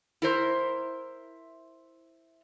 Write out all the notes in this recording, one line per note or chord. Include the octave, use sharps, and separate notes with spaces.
E4 A#4 C5 E5